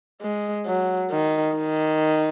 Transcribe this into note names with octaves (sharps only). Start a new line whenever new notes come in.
G#3
F#3
D#3
D#3